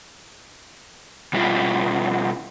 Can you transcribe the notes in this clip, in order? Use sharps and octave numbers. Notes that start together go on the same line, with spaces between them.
B2 G3 E4 F4 G#4